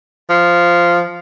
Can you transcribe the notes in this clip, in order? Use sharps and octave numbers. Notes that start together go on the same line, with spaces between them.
F3